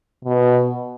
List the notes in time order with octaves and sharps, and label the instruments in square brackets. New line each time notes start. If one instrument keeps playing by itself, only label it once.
[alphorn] B2